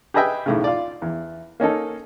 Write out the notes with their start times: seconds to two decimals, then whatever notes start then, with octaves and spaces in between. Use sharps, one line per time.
0.14 G4 G#4 B4 D#5 E5 G5
0.46 B1 A2 C#3
0.64 F4 D5
1.02 E2
1.60 A#3 C#4 D#4 A4